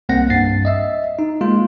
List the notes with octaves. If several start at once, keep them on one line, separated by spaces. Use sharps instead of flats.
C2 A#3 C4 F#5 A#6
G2 A6 C7
D#5 E5 E6
D#4
G#3 A#3 F4